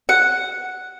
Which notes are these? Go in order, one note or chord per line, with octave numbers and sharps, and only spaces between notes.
F#5